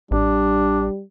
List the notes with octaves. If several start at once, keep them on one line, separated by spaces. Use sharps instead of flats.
A1 G3 D4